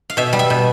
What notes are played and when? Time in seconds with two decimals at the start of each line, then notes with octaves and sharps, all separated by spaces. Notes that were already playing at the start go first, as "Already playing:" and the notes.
0.10 F5
0.17 B2 E5
0.33 G3
0.39 E5
0.50 B2